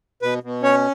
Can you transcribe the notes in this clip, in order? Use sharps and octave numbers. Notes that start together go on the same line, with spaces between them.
B2 B4
B2
C#4 C#5